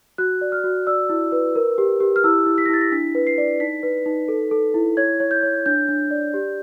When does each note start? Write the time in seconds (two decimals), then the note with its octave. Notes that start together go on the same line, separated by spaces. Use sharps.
0.18 F#4 F#6
0.41 D5
0.52 F6
0.64 F#4
0.87 D5 E6
1.09 E4
1.32 B4
1.55 A#4
1.78 G4
2.00 G4
2.16 F6
2.24 E4 E6
2.46 E4
2.58 B6
2.66 A#6
2.69 E4 A6
2.81 A#6
2.92 D4 B6
3.15 B4
3.27 C7
3.38 D5
3.60 D#4 B6
3.83 B4
4.06 D#4
4.28 A4
4.51 A4
4.74 E4
4.97 C#5 G#6
5.20 C#5
5.31 G6
5.43 C#5
5.66 D4 G6
5.89 D4
6.11 D5
6.34 G4